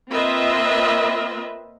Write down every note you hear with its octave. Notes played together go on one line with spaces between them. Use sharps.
A#3 C4 F4 B4 D#5 E5